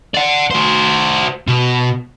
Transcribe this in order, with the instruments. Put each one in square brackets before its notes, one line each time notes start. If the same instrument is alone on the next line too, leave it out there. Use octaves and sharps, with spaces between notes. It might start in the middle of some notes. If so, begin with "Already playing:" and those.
[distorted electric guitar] D5 F#5
F#4 C5
B2